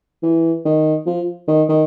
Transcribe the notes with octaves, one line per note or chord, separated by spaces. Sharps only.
E3
D#3
F3
D#3
D#3